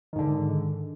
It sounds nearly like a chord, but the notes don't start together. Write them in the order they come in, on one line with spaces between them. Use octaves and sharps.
D#3 G#2 D3